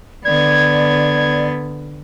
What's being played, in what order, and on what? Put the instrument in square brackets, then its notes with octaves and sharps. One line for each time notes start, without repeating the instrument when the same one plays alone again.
[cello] D3 B3 [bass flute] D5 [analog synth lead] G#6